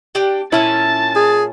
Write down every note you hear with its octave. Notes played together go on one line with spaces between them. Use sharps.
D4 G4 G5
A#2 C#4 E4 E5 A5 A6
G#4